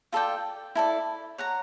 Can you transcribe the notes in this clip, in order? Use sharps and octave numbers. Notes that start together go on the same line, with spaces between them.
F4 A4 D5 G5
E4 A4 D5
C#5 F#5 A#5